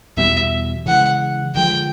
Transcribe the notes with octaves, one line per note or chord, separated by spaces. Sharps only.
E2 B2 G3 E5
C#3 E3 G#3 F#5
D3 F3 G#3 G5